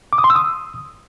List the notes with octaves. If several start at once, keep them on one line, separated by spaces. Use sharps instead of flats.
D6
D#6
C6
E6
D#6